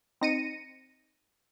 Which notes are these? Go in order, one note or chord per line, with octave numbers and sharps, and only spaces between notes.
C4 D#4 A#6 C#7 D#7